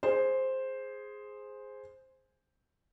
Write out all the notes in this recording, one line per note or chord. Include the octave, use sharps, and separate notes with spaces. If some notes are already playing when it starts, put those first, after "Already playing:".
G#4 C5